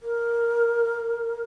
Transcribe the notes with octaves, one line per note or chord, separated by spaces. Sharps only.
A#4